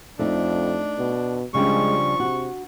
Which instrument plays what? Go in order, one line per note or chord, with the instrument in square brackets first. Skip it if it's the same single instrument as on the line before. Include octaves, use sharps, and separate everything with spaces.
[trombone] F2 [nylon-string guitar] A3 D#4 [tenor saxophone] D4
[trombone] B2
[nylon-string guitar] C#3 G3 D4 [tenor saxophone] F3 [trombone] G#3 [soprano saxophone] C#6
[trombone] C3 [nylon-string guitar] F#4